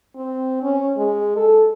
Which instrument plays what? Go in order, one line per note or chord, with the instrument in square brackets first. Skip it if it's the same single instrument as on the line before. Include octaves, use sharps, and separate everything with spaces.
[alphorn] C4
C#4
G#3
A4